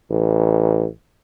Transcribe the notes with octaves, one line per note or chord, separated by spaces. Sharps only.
A1